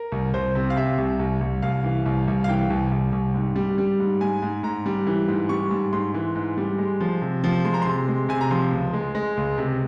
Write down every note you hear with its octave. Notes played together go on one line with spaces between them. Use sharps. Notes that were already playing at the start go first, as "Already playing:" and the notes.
Already playing: A#4
C2
C2 C5
C3
F5
C3 E5
C2
C2
C2
C2 F5
E3
C2
C2
F5
E3 G5
C2
C2
C2
G#2
G3
G3
G#2
G#2 G#5
G#2
G#2 A#5
G3
E3
G#2
G3 C#6
G#2
G#2 C6
E3
G#2
G3
G#3
F3
C3
F3
G#3 C6
A#5
C3 C6
G#3
C3 G#5
A#5
F3 C6
C#2
G#3
G#3
C#2
C3